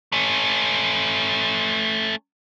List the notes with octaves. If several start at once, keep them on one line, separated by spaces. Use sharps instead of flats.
A3 C#4